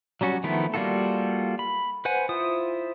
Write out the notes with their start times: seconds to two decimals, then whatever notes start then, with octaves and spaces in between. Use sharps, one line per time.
0.21 F#3 G3 C#4 F#4
0.44 D#3 F3 A3 B3 E4
0.74 G3 A#3 F4 F#4 A4
1.59 B5
2.05 B4 C5 F#5 G#5
2.29 E4 F4 C5 D#6